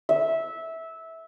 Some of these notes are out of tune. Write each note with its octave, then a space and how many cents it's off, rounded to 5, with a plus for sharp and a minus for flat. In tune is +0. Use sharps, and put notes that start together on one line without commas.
E5 -15